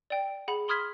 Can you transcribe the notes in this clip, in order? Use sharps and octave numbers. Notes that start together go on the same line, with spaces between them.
D5 G5
G#4 F#5 B5
B5 C6 D#6 F6 G#6 B6